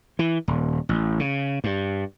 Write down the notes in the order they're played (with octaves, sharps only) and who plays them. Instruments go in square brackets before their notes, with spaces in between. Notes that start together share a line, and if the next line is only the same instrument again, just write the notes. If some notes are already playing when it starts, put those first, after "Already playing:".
[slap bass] E3
D#1
A1
C#3
G2